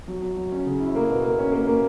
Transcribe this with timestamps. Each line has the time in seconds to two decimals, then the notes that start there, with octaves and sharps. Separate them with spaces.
0.08 F#3
0.22 F#3
0.37 F#3
0.52 C#4
0.66 C#3
0.80 E4
0.95 A#3
1.10 B2
1.24 A#3
1.39 C#4
1.52 A#3
1.67 A#3